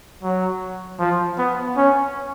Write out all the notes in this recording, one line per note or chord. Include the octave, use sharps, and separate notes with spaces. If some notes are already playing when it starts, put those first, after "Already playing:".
F#3
F3
B3
C#4